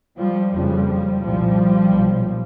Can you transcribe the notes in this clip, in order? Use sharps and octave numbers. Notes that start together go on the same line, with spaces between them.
F3 G3
F#1 F2 C#3 F3 G3
C2 A#2 F3 G3
B1 A#2